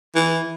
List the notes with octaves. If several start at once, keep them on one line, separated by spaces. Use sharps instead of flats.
E3